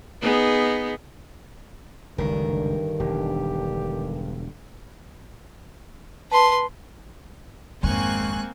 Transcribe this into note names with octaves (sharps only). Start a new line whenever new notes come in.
B3 D#4 G#4
F#1 C#2 G2 D3 D#3 A#4
E1 G4
B4 A5 C6
G#1 F2 G#3 A#3 C4 G#5 C#6 F#6